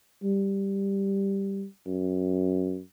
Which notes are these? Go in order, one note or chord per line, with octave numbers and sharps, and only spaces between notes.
G3
F#2